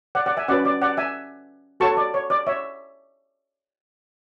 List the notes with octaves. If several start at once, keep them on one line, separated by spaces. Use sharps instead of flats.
D5 F#5
D5 F#5
E5 G#5
C#4 F#4 B4 D5 F#5
D5
D5 F#5
E5 G#5
F#4 A4 C#5 A5 C#6
D5
C#5
D5
C#5 E5